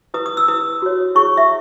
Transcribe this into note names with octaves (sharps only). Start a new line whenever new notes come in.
E4 B4 D#6
D#6
E6
E4 B4 D#6
F#4 C#5
E4 G#4 C#5 C#6
E5